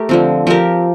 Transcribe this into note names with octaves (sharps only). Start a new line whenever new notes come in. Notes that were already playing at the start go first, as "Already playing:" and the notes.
Already playing: A3 G4 A#4
D3 F3 C4
F3 C4 G4 A#4